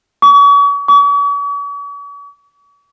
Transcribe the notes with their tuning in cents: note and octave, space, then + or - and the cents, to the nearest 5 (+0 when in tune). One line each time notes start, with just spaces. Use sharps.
C#6 +40
C#6 +45